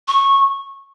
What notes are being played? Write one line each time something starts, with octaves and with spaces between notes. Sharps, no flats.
C#6